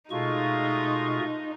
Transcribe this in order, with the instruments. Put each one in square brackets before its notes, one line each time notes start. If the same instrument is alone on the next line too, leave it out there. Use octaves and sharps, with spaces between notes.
[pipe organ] B2 C#6 [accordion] G#3 A3 F4 [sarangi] D#4